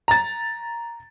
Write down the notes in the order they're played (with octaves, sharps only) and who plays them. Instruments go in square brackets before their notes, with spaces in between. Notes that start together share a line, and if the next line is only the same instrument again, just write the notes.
[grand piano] A#5 A6